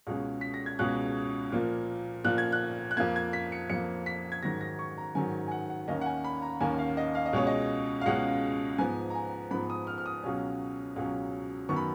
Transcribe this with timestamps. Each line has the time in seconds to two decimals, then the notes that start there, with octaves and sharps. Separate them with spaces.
0.07 C#2 B2 G#3 C#4
0.41 B6
0.54 A#6
0.66 G#6
0.79 C#2 B2 G#3 C#4 F#6
1.52 A#2 F3 A#3
2.24 A#2 F3 A#3 F#6
2.38 G#6
2.52 F#6
2.91 F#6
2.97 F2 F3 A#3 G#6
3.16 G#6
3.33 B6
3.52 C#7
3.70 F2 F3 A#3 C#7
4.06 B6
4.32 G#6
4.42 G#2 D#3 F#3 A#6
4.61 A#6
4.79 C#6
4.98 A#5
5.15 G#2 D#3 F#3 G#5
5.48 G#5
5.51 F#5
5.70 F#5
5.88 D#2 D#3 A#3 C#4 D#5
6.01 F#5
6.06 G#5
6.24 B5
6.42 A#5
6.60 D#2 D#3 A#3 C#4 G#5
6.78 F5
6.97 D#5
7.15 F5
7.26 D#5
7.33 C#2 B2 G#3 C#4 C#5
7.47 D#5
8.01 F5
8.06 C#2 B2 G#3 C#4 F#5
8.78 G#2 F3 B3 G#5
9.10 A#5
9.15 G#5
9.51 G#2 F3 B3 B5
9.70 D#6
9.87 F6
9.98 F6
10.06 D#6
10.23 C#2 B2 F#3 C#4
10.96 C#2 B2 F#3 C#4
11.69 F#2 D#3 F#3 B3 C#6
11.76 B5